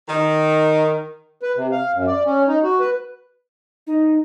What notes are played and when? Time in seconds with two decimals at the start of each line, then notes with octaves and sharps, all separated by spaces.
0.08 D#3
1.42 B4
1.57 C3
1.72 F5
1.95 F#2
2.07 D5
2.26 C#4
2.48 D#4
2.63 F#4
2.80 B4
3.87 D#4